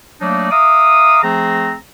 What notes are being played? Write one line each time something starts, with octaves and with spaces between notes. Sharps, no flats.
F#3 A3 A#3 D4 D#4 D5
E5 F5 A#5 D6 D#6
F3 A3 C4 G#4 A#5